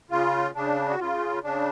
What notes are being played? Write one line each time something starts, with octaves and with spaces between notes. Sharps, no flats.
C#3 F4
C#3 D4
F#4
C#3 F4
C#3 D4